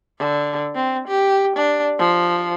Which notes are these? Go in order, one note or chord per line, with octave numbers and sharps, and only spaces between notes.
D3
C4
G4
D4
F3